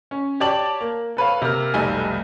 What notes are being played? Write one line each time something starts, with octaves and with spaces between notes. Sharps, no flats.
C#4
G4 C#5 D5 A5 D6 F#7
A#3
A4 B4 C#5 F5
C3 A#3 F6
F1 B1 G3 A3 D#4 G#5